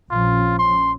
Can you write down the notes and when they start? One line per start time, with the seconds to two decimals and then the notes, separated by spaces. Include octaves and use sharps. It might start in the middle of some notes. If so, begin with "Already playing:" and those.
0.11 A#1 F3 C#4 F4
0.59 C6